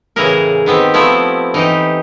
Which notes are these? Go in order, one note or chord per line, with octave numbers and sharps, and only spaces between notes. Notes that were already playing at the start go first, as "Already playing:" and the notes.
A2 C#3 E3 E4 G#4 A#4
D#3 B3 C4 G4
F3 A3 B3 C4 E4
E3 D#4 G4